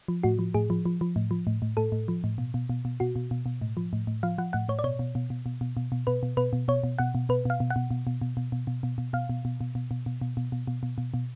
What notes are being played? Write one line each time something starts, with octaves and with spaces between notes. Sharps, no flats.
F3
A2 F#4
F3
A2 G#4
F3
F3
F3
A2
F3
A2
A2
A2 A4
A2
F3
A2
B2
B2
B2
B2
B2 F#4
B2
B2
B2
A2
F3
A2
A2
F3 F5
F3 F#5
A2 F#5
A2 C#5
D5
B2 C#5
B2
B2
B2
B2
B2
B2
B2
B2 B4
B2
B2 B4
B2
B2 C#5
B2
B2 F#5
B2
B2 B4
B2 F5
B2
F#5
B2
B2
B2
B2
B2
B2
B2
B2
B2
B2 F5
B2
B2
B2
B2
B2
B2
B2
B2
B2
B2
B2
B2
B2